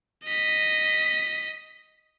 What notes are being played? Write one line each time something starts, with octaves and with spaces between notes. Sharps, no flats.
D#5 B6